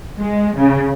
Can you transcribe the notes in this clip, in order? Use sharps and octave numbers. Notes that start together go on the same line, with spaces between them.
G#3
C#3